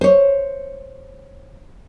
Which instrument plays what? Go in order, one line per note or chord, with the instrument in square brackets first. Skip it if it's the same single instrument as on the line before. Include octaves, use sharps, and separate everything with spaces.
[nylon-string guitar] C5 C#5